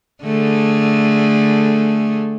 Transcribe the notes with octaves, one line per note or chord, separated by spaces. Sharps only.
D3 A3 G#4